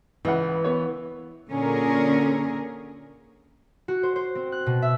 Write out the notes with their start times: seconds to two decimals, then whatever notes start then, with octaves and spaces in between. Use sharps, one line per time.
0.25 C#2 E3 E4 F#5
0.64 B3 C#5
1.50 A#2 D3 C#4 G#4 A#4
3.88 F#4
4.03 C5
4.16 C5
4.35 C4
4.52 F#6
4.66 B2
4.82 E5